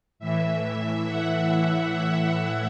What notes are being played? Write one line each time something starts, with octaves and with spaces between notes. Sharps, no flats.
A2 E3 E5
F#5
F#5